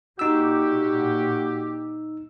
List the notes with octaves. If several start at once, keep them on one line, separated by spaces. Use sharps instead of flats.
A#2 D#4 F#4 G4 E6